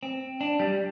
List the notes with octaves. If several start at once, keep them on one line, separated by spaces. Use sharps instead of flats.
C4
D4
G3